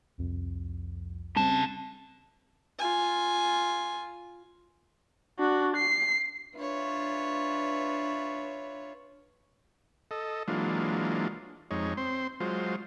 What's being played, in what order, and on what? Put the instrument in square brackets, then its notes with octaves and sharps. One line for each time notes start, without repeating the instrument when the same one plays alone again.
[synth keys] C2 F2
[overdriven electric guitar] C#3 A5 [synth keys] G3 C4
[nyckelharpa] F4 G#5
[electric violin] D4 F#4
C7
[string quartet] D4 F4 B4 C#5 E5
[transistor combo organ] A4 D#5
E3 F#3 G#3 A#3 D4 F4
F2 G#3 D#4 C#5
C4 C6
F#3 G#3 F4 C5